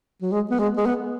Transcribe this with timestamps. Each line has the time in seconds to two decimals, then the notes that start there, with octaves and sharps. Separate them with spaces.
0.22 F#3
0.31 G#3
0.50 B3
0.59 G#3
0.77 G#3
0.86 B3